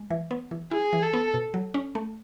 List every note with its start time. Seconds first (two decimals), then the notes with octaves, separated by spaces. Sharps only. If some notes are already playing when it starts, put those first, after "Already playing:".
Already playing: G#3
0.10 E3
0.31 B3
0.51 E3
0.71 E4 G#4
0.93 E3
1.03 A4
1.13 B3
1.34 B2
1.54 F#3
1.74 C#4
1.95 A3